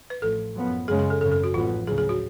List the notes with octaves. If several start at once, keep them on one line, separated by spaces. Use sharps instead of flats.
B4
A1 A2 F3 A4
F#2 F3 B3
F#2 C#3 G#3 G#4
G#4
A4
G#1 F#2 C#3 A4
A4
F#4
A1 G#2 F3 B3 F4
D2 C#3 F#3 G#4
G#4
F#4